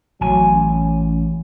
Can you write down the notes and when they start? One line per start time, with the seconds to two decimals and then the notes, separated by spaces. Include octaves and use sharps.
0.21 A1 F#3 G#5
0.54 C#4